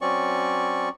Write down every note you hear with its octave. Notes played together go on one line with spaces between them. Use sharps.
F#3 C4 C#4 D5 C#6